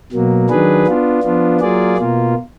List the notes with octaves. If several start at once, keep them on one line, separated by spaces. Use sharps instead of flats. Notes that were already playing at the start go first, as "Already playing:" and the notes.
B2 F#3 A#3
D#3 F#3 D4 G#4 B4
B3 D4 F4
F3 B3 D4 F4
F#3 A#3 F4 G#4 D5
B2 A#3 F4